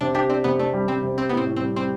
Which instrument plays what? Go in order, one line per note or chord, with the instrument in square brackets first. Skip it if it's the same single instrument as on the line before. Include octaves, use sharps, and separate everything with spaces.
[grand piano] C3 [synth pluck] D4
[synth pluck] D4 [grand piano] G4
[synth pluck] C4 [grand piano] D4
[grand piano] C3 [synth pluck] B3
[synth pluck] A3 [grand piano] D4
[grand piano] G3
[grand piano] G3 [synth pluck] C4
[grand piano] C3
[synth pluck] C4 [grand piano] G4
[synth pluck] B3
[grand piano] A2 [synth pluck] C4
[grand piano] A2
[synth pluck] C4
[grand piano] G3
[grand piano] G3 [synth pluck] C4